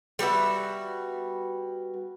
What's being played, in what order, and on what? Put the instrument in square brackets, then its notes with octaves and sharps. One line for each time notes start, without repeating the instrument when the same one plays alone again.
[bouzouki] G3 B3 F#4 E5